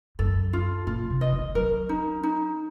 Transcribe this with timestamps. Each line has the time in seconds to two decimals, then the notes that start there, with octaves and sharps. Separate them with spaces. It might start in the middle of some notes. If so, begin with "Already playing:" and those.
0.19 F#2 A4
0.53 F4
0.87 A#2 F4
1.10 C3
1.21 D#5
1.33 D#3
1.55 F#3 A#4
1.89 D#4
2.23 D#4